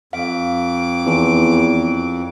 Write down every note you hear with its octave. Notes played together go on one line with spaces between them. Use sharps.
F2 F5 D6
E2